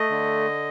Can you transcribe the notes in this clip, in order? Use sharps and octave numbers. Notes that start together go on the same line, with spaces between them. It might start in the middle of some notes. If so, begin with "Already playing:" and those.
Already playing: A3 D#5
D3